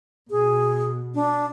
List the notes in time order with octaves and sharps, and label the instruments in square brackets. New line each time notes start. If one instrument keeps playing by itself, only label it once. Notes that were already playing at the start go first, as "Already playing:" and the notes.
[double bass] B2 [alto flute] G#4
[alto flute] D4